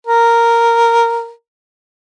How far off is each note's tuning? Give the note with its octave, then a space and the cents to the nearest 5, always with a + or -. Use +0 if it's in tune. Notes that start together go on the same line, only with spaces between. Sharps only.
A#4 -5